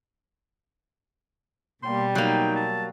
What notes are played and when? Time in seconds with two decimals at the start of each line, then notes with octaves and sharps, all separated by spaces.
1.83 B2 G3 A#3 C6
2.15 F#3 A#3 D#4 G5
2.56 A5